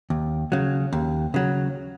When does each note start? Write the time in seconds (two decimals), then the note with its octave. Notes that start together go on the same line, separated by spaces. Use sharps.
0.10 D#2
0.52 C#3 F#3
0.93 D#2
1.34 C#3 F#3